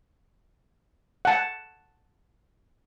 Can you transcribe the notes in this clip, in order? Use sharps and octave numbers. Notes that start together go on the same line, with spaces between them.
F#5 A5